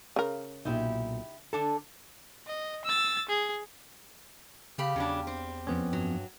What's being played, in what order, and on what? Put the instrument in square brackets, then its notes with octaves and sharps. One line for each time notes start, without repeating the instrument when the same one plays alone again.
[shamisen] C#3 A#4
[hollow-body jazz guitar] B1 A#2 [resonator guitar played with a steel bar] D#4 E4 G4
[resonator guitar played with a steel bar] D3 D4 A5 [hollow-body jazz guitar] A4
[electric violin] D#5
E6 A6
G#4
[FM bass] C#3 [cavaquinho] G4 F5 B5
[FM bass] E2 [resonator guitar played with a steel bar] C#3 F#3 D4
[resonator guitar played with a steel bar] C4
[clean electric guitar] F2 B3 C#4
[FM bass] G2 [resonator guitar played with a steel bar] F#3